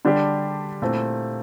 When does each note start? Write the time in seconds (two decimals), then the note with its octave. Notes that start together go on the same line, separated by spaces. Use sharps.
0.05 D3 G3 D4 G4 D5
0.82 A#2 A3 C4 E4